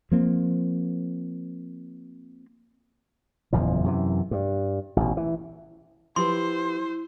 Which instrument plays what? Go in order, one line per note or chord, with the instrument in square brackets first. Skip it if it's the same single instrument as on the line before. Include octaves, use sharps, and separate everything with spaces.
[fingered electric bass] F3 A#3 C4
[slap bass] F#1 E2 A#2 F3
F#2 C3 E3
G2
A1 B2
E3
[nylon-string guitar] F3 G4 B4 [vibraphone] E4 [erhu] C5 [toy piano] C6